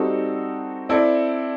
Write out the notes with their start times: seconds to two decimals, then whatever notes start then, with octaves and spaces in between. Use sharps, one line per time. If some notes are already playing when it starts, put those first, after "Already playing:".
Already playing: G3 C4 D#4 F#4 A4
0.89 C4 E4 A4 D5